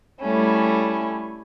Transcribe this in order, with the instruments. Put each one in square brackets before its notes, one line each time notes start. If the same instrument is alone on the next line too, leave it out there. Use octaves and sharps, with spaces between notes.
[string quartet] G3 A3 C#4 E4